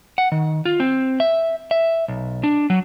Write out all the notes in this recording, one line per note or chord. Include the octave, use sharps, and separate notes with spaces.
F#5
D#3
F4
C4
E5
E5
B1
D4
F#3